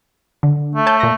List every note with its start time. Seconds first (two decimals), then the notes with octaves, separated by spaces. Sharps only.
0.43 D3
0.75 A3
0.86 C#5 A5 G6
1.00 A#2 A#6